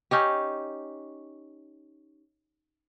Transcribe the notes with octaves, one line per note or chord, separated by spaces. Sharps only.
C#4 D#4 G4